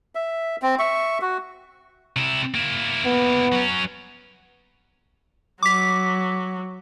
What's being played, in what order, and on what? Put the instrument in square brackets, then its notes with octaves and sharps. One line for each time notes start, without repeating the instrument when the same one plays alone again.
[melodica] E5
C4
E5 C#6
F#4
[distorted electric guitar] C3 E4
A#3 E4
[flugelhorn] B3
[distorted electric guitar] F#3 C#4
[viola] F#3 [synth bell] D6 B6